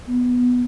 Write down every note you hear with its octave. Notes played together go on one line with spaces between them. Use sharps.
B3